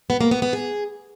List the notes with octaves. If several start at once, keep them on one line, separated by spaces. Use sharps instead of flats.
B3
A#3
B3
B3
G#4